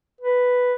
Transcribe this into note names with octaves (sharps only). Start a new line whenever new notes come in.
B4